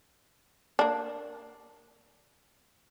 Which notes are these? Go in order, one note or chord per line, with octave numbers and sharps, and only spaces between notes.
A#3 D4